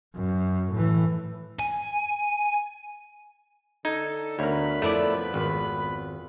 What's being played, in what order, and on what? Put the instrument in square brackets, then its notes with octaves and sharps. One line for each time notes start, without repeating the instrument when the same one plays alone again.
[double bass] F#2
A2 E3
[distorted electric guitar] G#5
[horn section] D3 A4 [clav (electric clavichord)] D#4 [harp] G#6
[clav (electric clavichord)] D2 [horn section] B3 B4 B5 [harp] A#4 C#5
[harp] F2 [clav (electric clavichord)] A3 E4 D5
[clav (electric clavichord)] G#1